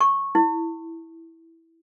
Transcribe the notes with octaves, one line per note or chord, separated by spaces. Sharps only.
C#6
E4